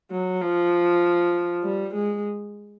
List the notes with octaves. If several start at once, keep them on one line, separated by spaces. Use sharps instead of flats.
F#3
F3
G3
G#3